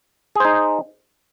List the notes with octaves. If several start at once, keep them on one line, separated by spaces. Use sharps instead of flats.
D#4 G#4 C5